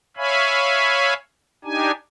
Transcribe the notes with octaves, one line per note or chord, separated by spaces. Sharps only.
C#5 E5 F5 G#5 B5
D4 D#4 G4 G#5